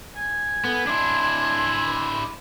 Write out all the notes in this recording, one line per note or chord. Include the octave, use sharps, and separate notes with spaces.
G#5
B3 A4
D4 E4 C6